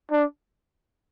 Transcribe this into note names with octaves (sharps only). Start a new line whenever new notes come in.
D4